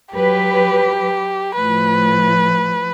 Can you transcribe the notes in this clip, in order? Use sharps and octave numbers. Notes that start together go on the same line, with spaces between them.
F#3 G4 B4
A2 F3 B4